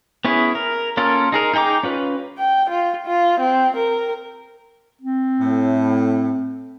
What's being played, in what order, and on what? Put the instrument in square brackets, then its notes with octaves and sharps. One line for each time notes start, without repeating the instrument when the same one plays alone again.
[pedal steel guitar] B3 C#4 E4 G#4
A#4
A#3 C#4 F4 A4 A#4
D#4 G#4 A#4
D#4 G#4 G5 A#5 D6
C#4 F4 B4
[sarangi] G5
F4
F4
C4
A#4
[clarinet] C4
[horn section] A2